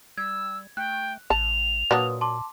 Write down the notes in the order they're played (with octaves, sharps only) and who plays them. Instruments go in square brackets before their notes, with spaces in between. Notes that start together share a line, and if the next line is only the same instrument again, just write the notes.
[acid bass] G3 [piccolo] E6 [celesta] G#6
[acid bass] A3 [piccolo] G5 [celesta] F#6
[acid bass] A1 [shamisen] A5 [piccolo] F7
[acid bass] A#2 [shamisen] F#3 A#3 D4 [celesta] B4 D#6
[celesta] A5 C6 D6